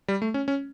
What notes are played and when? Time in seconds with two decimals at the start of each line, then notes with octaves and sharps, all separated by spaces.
0.08 G3
0.22 A3
0.34 C#4
0.48 C#4